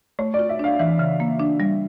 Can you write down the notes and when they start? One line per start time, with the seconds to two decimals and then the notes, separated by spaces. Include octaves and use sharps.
0.19 A3 C#5
0.34 D5
0.39 F4
0.49 E5
0.59 D4 F5
0.79 E3 E5
0.99 C#3
1.20 A#3
1.39 D4
1.60 G3